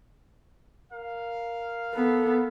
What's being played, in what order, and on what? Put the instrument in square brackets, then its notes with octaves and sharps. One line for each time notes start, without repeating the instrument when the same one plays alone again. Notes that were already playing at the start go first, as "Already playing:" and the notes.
[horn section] A#4 F5
[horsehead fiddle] B3 [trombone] A4